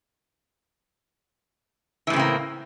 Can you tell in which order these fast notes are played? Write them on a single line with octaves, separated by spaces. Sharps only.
E3 A2 C#3 C4 A#3